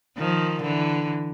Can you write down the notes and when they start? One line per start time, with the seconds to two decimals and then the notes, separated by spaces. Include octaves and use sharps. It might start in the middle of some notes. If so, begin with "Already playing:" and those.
0.17 D#3 F3
0.62 D3 E3